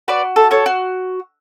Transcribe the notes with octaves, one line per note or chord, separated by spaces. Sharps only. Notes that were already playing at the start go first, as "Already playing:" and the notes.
F#4 B4 D5
A4
A4 C#5
F#4